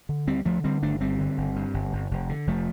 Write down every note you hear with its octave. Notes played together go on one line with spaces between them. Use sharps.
D3
D2 G3 C4
D2 F3 A3
D3 G3 C4
G1 A3 D4
G1 G3 C4
D3
G1
G2
G1
G1
F1
D3
F1 F3 A3